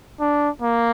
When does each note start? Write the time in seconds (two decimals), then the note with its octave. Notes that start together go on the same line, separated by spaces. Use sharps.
0.21 D4
0.62 A#3